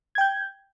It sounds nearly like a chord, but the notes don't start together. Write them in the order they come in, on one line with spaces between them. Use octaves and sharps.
G#6 G5 G6